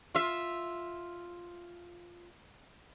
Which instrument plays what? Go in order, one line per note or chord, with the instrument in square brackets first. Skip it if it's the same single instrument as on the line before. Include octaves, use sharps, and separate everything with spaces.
[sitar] F4 E5